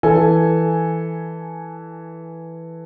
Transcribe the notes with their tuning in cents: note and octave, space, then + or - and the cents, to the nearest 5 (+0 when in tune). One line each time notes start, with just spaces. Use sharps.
E3 +0 A4 +0 G#5 +0